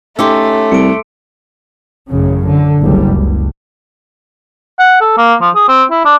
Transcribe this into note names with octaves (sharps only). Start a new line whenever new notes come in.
A3 C#4 D#4 G4 C6 D6 E6
C2 C#7 D7
A1 F#2 C#3
D3
F#1 C2 G3
C#2
F#5
A4
A#3
F3
G#4
C4
E4
D4